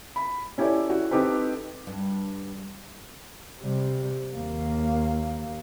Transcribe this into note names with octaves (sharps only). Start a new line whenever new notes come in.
B5
C#4 E4 G4 A4 C#5 D5
E4 F#4
C4 D#4 G4 A4 B4 C5
G2
C3 G3
D#2 A#3